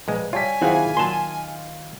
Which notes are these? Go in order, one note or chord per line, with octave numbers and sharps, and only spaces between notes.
A#1 G#3 A#3 B4
G3 F4 C#5 G#5 A5 B6
D#3 F#3 C4 E4 F4 G#4 F5 F#5
A#2 F#3 A5 C6